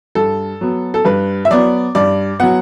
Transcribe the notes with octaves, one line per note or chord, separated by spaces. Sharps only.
G2 A4
F#3 B3
A4
G2 B4
E5
F#3 B3 D5
G2 D5
F#3 B3 F#5